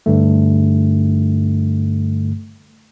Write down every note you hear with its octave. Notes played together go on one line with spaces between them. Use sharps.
G2 D3 A3